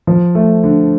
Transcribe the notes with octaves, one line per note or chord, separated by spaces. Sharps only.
F3
A3
D3